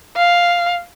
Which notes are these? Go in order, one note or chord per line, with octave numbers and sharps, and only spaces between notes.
F5